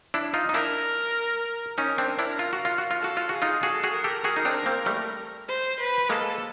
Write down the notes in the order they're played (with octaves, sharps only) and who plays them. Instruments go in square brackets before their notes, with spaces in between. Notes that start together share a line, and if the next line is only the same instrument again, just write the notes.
[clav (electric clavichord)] D4 E4
D#4 F4
D#4
[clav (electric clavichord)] D4 E4 [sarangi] A#4
[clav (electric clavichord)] C#4 D#4 [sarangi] A#4
[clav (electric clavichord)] C4 D4
D4 E4
F4
F#4
F4
F#4
F4
[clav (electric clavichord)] F#4 [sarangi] A4
[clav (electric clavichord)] F4
[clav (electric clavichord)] F#4 [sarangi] G#4
[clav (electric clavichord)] D#4 F4
[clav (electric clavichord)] F#4 G#4 [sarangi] A4
[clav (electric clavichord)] F#4 G#4
[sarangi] A#4
[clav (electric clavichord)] G4 A4
F#4 G#4
D#4
C4 D4
A#3 C4
G3 A3
[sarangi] C5
B4
[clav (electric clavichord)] G#3 A#3 [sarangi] A4